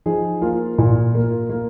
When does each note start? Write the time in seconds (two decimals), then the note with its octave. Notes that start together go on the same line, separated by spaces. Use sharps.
0.06 F3 D#4 G#4
0.41 A#3 F4
0.78 A#2
1.15 A#3
1.50 A#3